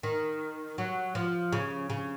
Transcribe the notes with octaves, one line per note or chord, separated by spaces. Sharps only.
D#3
F#3
F3
C#3
C#3